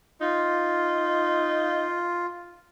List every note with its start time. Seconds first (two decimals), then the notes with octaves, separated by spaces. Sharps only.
0.21 D#4 F4